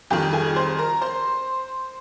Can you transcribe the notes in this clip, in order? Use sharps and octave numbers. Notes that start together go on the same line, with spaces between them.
F2 D#3 G3 G4 G5
G#4 G#5
C5 C6
A#4 A#5
C5 C6